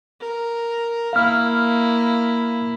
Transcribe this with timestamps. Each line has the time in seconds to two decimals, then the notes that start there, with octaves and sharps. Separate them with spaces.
0.21 A#4
1.13 A#3 E4 F5 F6